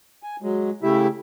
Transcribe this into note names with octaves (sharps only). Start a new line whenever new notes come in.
G#5
F#3 G#3
C#3 A3 E4 G4 E5